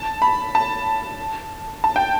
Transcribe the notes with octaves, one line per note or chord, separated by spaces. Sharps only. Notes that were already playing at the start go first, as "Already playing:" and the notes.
Already playing: A5
B5
A5
A5
G5